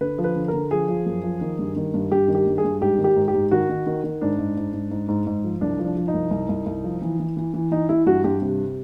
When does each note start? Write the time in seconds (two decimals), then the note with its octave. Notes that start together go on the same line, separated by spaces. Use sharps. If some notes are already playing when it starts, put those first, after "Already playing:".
0.01 D3 B4
0.18 F3
0.24 B4
0.36 D3
0.48 A#4
0.53 D3
0.71 F3 G#4
0.89 F3
1.06 F#2
1.23 F3
1.41 D#3
1.59 G2
1.76 D#3
1.94 G2
2.11 G2 G4
2.28 D#3
2.35 G4
2.46 G2
2.58 G#4
2.64 G2
2.81 G#2 G4
2.98 D#3
3.04 G4
3.16 G#2
3.28 G4
3.34 G#2
3.51 D#3 F#4
3.69 D#3
3.86 D#3
4.04 D#3
4.21 G#2 D4
4.39 G#2
4.57 G#2
4.74 G#2
4.91 G#2
5.09 G#2
5.27 G#2
5.44 F3
5.61 C2 D4
5.79 F3
5.85 D4
5.97 F3
6.08 D#4
6.14 C2
6.31 C2
6.49 C2
6.66 C2
6.84 F3
7.02 E3
7.19 E3
7.37 E3
7.54 E3
7.71 E3 D#4
7.89 E3 E4
8.06 G2 F#4
8.24 G2 G4
8.42 C3